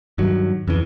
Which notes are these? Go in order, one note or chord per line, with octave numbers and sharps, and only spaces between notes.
G2 D#3 F#3
F2 C#3 E3